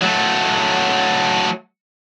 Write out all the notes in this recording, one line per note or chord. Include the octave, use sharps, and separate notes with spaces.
F#3 A3